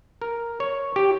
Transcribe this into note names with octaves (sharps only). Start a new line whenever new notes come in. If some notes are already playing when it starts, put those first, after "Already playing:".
A#4
C#5
G4